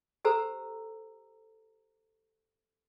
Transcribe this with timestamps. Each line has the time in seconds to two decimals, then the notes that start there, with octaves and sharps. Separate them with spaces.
0.25 G4 A4 C5 A#5 E6